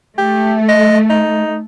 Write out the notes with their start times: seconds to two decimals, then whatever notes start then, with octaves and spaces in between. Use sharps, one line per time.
0.18 A3 G4
0.69 D#5
1.10 D#4